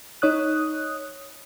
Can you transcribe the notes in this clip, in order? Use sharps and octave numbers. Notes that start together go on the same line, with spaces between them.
D#4 C#5 D#6 F#6